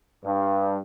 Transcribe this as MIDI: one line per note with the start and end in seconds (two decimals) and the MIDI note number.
0.24 0.79 43